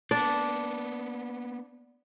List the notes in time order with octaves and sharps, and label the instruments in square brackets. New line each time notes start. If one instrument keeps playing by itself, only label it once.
[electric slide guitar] A#3 B3 [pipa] D4 [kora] D5